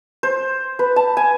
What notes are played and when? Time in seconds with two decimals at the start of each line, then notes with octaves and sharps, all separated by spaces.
0.23 C5
0.79 B4
0.96 A5
1.17 G#5